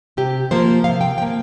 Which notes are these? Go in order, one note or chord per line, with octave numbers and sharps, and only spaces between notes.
C3 G4
F3 A#3 C5
C3 F5
G5
F3 A#3 G5